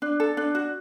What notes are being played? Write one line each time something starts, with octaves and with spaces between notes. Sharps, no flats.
D4
A4
D4
F#4